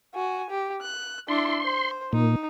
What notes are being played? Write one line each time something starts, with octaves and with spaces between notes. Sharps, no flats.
F#4 G#5
G4
F#6
D4 E4 C6
C5
A#2 D#4